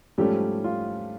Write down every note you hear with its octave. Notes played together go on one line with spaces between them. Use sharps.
G#2 F3 G3 A3 C#4 G4
F4